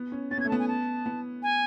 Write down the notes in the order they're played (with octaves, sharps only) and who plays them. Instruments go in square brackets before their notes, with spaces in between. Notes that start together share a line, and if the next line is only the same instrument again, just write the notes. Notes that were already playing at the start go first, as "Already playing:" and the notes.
Already playing: [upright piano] B3
C#4
[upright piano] C#4 [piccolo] A6
[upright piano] B3
[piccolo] G#6
[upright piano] A3
[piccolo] A5
[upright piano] B3
[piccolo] G#5
A5
[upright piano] B3
[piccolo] G#5